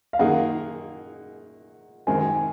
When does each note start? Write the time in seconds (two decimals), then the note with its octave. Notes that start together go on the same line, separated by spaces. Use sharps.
0.13 F5
0.19 F#2 D#3 A#3 D#4 G#4 F#5
2.07 F#2 D#3 G#3 C4 G#5